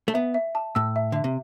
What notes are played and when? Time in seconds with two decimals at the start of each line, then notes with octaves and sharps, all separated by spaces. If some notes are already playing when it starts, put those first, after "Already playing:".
0.08 A3
0.14 B3 E5
0.34 E5
0.55 A5
0.75 A2 E6
0.96 E5
1.12 D3 E5
1.24 C3